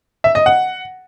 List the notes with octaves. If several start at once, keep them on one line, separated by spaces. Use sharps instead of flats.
E5
D#5
F#5